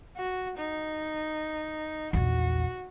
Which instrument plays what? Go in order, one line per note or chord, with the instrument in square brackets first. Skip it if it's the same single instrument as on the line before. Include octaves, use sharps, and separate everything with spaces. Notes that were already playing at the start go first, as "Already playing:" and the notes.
[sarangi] F#4
D#4
[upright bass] A#1 E2 [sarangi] F#4